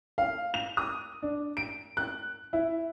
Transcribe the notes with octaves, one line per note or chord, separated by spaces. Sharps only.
F5
F7
D#6
D4
D7
F#6
E4